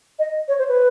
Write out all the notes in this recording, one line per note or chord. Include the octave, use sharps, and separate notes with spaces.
D#5
C#5
C5
B4